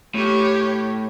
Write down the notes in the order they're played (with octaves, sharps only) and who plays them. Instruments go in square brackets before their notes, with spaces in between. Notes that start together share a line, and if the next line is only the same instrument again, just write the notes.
[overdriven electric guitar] A2 [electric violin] G4 C#5